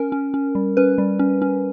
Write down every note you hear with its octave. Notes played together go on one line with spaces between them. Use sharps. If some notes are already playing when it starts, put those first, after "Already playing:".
Already playing: C#4 A#4
C#4
C#4
G3
C#4 B4
G3
C#4
C#4